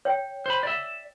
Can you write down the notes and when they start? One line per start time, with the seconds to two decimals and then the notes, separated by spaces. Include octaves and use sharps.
0.05 C#5 G5
0.46 C5 B5
0.63 D5 E5